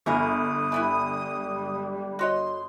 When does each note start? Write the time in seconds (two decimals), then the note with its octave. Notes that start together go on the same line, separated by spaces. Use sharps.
0.06 G1 E4 G#4 A#4 D#6
0.72 E3 G3 B3 E4
2.19 F#4 C#5 D#5 C6